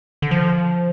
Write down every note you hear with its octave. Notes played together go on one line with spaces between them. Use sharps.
D3
F3